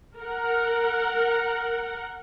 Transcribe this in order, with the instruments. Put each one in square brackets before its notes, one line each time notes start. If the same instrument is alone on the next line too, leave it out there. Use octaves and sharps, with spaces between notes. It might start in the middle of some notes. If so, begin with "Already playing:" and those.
[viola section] A#4 F#5